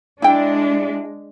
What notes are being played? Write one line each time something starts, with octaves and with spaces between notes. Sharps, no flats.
G#3 D4 E4 G5